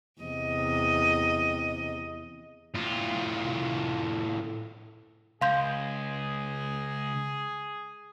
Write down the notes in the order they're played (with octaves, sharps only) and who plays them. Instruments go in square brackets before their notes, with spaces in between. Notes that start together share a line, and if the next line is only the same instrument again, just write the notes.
[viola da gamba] E2 C3 D#5
[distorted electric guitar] A2 F4
[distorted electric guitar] C#2 [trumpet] G#4 [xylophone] F5 C6 G6